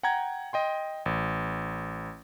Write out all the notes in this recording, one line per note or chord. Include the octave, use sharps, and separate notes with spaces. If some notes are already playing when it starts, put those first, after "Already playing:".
F#5 G5 A#5 G#6
D#5 G5 C6
A1